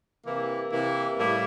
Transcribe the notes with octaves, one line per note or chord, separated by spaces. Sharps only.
C3 E3 A#3 E4
C3 E3 A#3 E4
A2 G3 A#3 E4